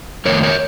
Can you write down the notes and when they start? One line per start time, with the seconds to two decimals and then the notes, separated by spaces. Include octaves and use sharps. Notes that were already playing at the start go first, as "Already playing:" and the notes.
0.25 F2 D#3 A3 A#4 C#5
0.43 A#4 C#5